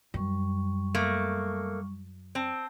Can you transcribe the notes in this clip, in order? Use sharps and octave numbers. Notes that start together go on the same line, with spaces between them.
F#2 G3 C#6
A3 A#3
C4 A5